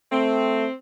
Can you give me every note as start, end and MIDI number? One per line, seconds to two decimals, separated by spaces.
0.12 0.65 57
0.12 0.73 60